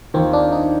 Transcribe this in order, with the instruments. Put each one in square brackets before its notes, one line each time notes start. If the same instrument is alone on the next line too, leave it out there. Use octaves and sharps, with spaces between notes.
[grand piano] D#2 D#3 A#3 F4 [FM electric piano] C4
[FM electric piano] D4
D#4